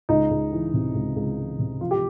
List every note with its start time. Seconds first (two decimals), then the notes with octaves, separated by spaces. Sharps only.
0.09 C#2 D#4
0.30 C#2
0.52 E3
0.73 C3
0.95 C#2
1.16 C#2
1.38 E3
1.59 C3
1.81 F3 F4
1.91 G4